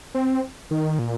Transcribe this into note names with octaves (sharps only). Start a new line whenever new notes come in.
C4
D#3
A#2